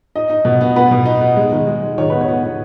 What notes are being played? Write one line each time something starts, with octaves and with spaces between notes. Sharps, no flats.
D#4 D#5
D#4
B2
B3
B3 B4
B2
D#4
B3
G#3
D#3
G#3
G#3
D#3 C#5
B3 B4
C#5
B3
B3